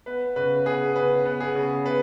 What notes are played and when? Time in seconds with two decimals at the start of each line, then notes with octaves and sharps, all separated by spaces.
0.06 B3 B4
0.36 C#3 B4
0.66 B3 G#4
0.95 C#3 B4
1.25 B3
1.40 G#4
1.55 C#3
1.85 B3 B4